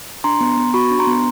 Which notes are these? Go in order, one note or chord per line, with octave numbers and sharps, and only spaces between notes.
D4 A#5 C6
B3
B3
F#4 B5 C#6
D4
A#5 C6
B3